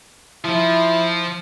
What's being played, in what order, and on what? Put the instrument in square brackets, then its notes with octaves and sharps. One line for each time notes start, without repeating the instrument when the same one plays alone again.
[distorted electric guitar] F3 [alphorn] E4